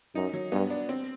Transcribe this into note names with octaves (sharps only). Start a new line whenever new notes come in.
F#2 D#4
F#3
G2 B3
D4
C4